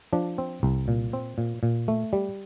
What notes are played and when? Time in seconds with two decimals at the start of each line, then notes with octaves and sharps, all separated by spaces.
0.13 F3 D4
0.38 C4
0.63 C2
0.88 A#2
1.13 C4
1.38 A#2
1.63 A#2
1.88 A3
2.13 G3